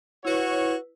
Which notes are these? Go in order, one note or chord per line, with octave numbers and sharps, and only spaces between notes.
E4 F#4 B4 C#5